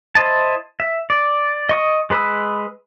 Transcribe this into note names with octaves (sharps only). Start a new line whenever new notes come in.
E4 C5 D#5 A5
E5
D5
D#5 C#6 D#6
G#3 B4 B5 D#6 E6